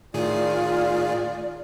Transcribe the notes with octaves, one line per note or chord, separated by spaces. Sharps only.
A2 D#3 F4 G#4 D5